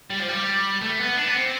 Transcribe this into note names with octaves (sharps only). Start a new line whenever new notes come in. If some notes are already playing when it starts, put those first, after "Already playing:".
G3
F3
G3
A3
B3
D4
B3
C4